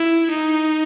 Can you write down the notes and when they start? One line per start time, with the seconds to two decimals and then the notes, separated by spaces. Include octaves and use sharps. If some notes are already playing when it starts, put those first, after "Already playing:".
Already playing: E4
0.30 D#4